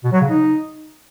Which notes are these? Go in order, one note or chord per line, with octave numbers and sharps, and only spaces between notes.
B2
F#3
C#3
D#4